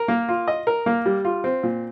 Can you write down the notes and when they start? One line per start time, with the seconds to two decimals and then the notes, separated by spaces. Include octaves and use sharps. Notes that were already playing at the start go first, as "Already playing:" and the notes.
Already playing: A#4
0.08 A#3
0.29 F4
0.48 D#5
0.67 A#4
0.86 A#3
1.06 G3
1.25 F4
1.44 C4
1.63 A#2